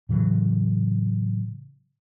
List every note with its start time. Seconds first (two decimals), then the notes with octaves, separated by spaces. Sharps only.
0.09 A2 C#3 E3 F#3